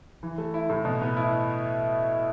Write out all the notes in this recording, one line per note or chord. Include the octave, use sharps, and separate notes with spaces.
E3
A3
E4
A2
B2
B3
E4